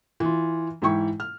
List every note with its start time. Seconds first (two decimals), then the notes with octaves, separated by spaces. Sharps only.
0.20 E3 F4
0.82 G#2 E3 E4 G5 C#6
1.20 F6